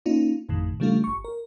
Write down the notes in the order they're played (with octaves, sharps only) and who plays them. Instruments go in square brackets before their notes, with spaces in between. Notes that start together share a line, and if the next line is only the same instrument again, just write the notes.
[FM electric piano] A#3 C#4 D#4 F4
G#1 F2 A2 D#3
C#3 F3 G3 A3 D4 F4
G1 C#6
A#4